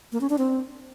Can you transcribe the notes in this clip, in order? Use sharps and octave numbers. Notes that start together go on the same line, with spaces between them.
A#3
C#4
D4
C4